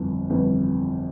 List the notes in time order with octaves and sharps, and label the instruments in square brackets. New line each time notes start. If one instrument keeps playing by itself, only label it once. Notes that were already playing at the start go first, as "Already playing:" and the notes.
Already playing: [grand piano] G1 F2 E3
G1 F2 E3